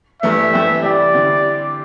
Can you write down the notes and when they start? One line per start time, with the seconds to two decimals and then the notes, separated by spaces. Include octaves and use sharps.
0.22 G2 E3 A3 E5
0.53 E3 A3 C4 G4
0.83 C3 G3 E4 G4 D5
1.14 D3 G3 C4 E4 G4